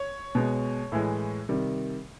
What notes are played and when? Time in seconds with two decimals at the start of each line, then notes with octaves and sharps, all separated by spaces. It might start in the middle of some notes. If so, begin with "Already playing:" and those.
Already playing: C#5
0.35 B2 G#3
0.92 A2 E3 G#3
1.49 C3 D#3 G3